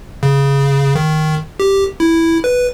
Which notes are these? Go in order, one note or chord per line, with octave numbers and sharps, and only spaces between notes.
C#3
D#3
G4
E4
B4